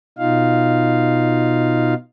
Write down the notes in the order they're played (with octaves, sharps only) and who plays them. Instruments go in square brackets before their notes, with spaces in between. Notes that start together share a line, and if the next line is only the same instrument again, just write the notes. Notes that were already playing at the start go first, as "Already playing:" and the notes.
[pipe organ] B2 D#4 F4 F5